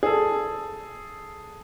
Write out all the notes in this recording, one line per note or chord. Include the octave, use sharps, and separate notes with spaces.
G#4 A4